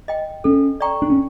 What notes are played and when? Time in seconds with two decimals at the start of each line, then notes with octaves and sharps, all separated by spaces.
0.08 D#5 G5
0.44 C#4 A4
0.80 D5 G5 A#5 C#6
1.02 D4
1.10 C#4